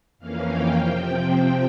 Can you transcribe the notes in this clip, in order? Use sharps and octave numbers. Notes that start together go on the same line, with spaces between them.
F2 E3 A#3 C#4 F5
G5
C3 F3 C4